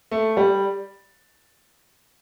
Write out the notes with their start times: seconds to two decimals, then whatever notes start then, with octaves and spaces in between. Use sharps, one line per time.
0.11 A3
0.37 G3